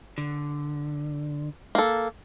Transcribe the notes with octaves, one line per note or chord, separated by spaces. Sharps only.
D3
A#3 A4